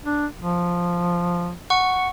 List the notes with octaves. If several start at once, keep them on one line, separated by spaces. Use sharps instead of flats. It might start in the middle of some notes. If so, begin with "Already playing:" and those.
D4
F3
F#5 C#6